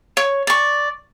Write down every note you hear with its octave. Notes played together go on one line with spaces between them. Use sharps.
C#5
D5 C#6